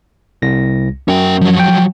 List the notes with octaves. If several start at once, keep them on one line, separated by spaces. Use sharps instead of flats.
C2 A#6
F#2 C#4 G5
F3 F#3
G5